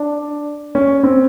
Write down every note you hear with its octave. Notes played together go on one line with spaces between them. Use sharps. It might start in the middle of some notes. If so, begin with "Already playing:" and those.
Already playing: D4
C#4
C4